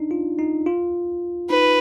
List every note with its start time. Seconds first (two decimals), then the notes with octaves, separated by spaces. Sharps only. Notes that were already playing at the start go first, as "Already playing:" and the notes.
Already playing: D4 D#4
0.11 F4
0.38 D#4
0.66 F4
1.50 D#4 B4